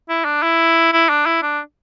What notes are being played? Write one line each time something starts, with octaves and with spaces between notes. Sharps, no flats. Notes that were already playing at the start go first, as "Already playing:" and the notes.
E4
D4
E4
E4
D4
E4
D4